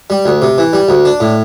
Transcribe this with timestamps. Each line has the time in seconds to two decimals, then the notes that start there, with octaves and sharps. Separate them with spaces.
0.10 G3
0.26 D2
0.42 C3
0.58 E3
0.73 G3
0.89 D2
1.05 D4
1.20 A2